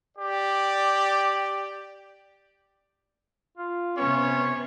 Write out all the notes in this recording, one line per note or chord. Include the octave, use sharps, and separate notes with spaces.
G4 D5
F4
C3 B3 C#4 C#5